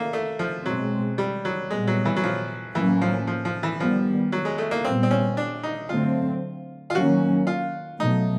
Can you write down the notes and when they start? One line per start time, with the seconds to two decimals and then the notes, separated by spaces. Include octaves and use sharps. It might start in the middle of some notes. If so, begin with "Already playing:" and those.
Already playing: A3 A#3
0.13 A3
0.39 F3
0.66 B2 F#3 G#3 C4
1.18 G3
1.45 F#3
1.70 A#2 G3 G#3 B3
1.87 F#3
2.05 E3
2.16 F#3
2.24 F3
2.75 A2 E3 F#3 A#3 C#4
3.01 F3
3.27 F3
3.45 F3
3.63 E3
3.80 D#3 F3 G3 B3
4.32 F#3
4.45 G#3
4.58 A3
4.71 A#3
4.85 A#2 G3 B3 C4
5.03 C4
5.11 C#4
5.37 D4
5.63 D#4
5.89 D3 F#3 A3 C4 F4
6.90 F4
6.95 D#3 F#3 A#3 C#4 F#4
7.47 F4
8.00 B2 F#3 A3 D#4